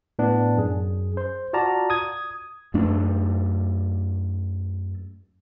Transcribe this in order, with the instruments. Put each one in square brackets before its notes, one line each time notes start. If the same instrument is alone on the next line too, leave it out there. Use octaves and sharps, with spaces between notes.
[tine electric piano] A2 B3 D4
F#2 G#4
C5 C6
F4 F#4 D5 F5 A5 A#5
D#6 G#6
[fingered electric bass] F#2 A3 D4